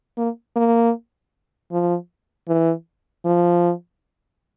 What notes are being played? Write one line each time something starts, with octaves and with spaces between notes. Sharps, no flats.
A#3
A#3
F3
E3
F3